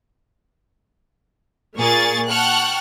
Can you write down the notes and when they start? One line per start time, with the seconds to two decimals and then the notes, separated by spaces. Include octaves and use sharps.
1.77 A#2 A#3 G#4 A#4 C#6 A6
2.29 F#5 G5 A5 C#6 F6 F#6